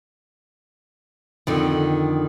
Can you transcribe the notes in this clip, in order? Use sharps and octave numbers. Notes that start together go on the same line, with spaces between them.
F2 D3 D#3